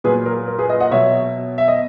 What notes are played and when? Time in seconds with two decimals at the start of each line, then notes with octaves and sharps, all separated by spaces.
0.04 A#2 F#3 G#4 B4
0.26 A#4
0.48 A#4
0.59 G#4 B4
0.69 B4 D#5
0.80 D#5 F#5
0.91 B2 F#3 C#5 E5
1.58 E5
1.68 D#5